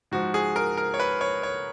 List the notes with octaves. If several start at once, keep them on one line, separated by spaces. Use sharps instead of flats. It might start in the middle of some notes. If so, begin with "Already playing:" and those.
G#2 F3 F#4
G#4
A#4
A#4
C#5
B4
C#5
C#5